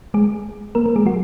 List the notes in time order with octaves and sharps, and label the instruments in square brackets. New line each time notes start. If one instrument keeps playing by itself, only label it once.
[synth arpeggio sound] G#3 G#4
A#3 A#4
A#3 A#4
G#3 G#4
F#3 F#4